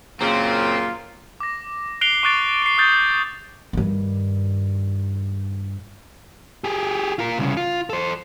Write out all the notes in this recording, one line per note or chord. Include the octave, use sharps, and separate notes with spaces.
F#2 A#2 C#3 C4 F4
D6 A#6
F#6 C7 D7 F7 G7
C#6 D6 F#6 A6 D7
C7 D7
D#6 F#6 G6 A6 D7
G2 D#3
G4 G#4
F4 A#4
C2 C#3
F4
A4 C5